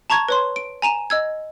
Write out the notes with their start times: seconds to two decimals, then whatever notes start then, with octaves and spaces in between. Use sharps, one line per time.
0.10 A5 A#5 C#6 G#6
0.28 B4 C#5 C6
0.56 D7
0.82 G#5 A#5 D#7 E7
1.10 D#5 E6 G#6